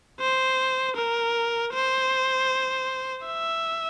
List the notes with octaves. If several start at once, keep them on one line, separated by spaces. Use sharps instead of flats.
C5
A#4
C5
E5